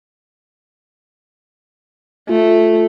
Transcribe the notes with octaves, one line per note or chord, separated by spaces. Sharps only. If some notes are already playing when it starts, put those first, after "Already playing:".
A3 F4